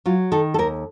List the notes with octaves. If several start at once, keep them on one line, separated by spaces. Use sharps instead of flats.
F#3 F4
D#3 A4
A4
D#2 A#4